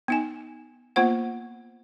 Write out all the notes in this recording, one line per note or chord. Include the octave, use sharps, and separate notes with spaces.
B3 D#4 G#5
A#3 B3 F4 C5 F#5